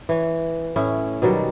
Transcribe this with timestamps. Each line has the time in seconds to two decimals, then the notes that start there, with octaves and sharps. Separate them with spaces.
0.09 E3 C#5
0.76 A2 C#4 E4
1.22 B2 D#3 F#3 G3